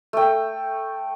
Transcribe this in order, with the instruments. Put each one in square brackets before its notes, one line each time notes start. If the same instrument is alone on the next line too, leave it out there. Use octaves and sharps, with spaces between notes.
[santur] A3 G5